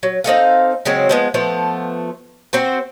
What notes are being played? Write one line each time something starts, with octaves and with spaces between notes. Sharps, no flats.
F#3
C4 D#4 A4 F5
C#3 F#3 G#3 C4
F3 G#3 B3
F3 A3 B3 A4
C4 F#4 C5